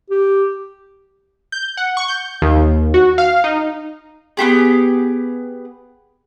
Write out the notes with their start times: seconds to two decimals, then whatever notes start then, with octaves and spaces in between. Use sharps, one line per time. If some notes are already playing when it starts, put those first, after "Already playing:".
0.11 G4
1.52 G6
1.77 F#5
1.97 C#6
2.08 G6
2.42 D#2
2.94 F#4
3.18 F5
3.44 D#4
4.37 B3 F4 G4 G#4